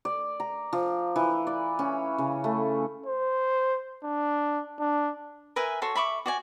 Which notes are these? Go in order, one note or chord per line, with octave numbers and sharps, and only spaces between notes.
D5
A#5
F3
E3
D5
C#4
C#3
A3
C5
D4
D4
A#4 B4 E5 G#5
F#4 A4 C#5 C6
E5 B5 C#6 D6
F#4 D5 G#5